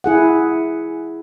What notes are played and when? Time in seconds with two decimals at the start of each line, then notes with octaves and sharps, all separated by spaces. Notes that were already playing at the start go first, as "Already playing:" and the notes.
0.04 E4 G#4 F#5